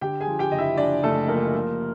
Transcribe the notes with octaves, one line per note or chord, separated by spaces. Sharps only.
D3 G4 G5
G#4 G#5
F3
G4 G5
F#1 D#5
E4 E5
F3 D4 D5
F#1 A3 A4
F3 A#3 A#4
F3